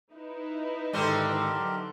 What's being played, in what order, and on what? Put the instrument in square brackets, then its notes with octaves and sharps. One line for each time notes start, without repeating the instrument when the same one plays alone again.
[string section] D#4 E4 B4
[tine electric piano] G#2 D#3 G#3 [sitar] D3 C4 C5 [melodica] G4 A#4
[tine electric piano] F#3